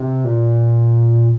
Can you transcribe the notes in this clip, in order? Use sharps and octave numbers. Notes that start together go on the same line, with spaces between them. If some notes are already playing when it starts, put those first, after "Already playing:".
Already playing: C3
A#2